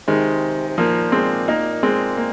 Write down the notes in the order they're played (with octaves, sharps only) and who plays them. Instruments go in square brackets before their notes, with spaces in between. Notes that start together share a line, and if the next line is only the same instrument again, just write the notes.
[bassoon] C3 [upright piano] D#3 G#3
[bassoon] C3
[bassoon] A#2 [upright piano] F3 A#3
[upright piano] G#3 C4
A#3 D#4
G#3 C4
A#3